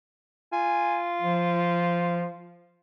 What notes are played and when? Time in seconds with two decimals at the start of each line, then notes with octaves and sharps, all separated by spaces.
0.52 F4 G#5
1.21 F3